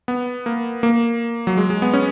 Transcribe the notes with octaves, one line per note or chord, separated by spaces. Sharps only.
B3
A#3
A#3
F#3
G#3
G#3
B3
C#4